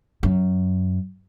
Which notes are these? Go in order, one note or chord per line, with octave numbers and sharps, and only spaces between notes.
F#2